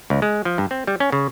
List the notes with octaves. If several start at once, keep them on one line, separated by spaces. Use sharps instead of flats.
C#2
G#3
F3
G2
C4
G3
C#4
C#3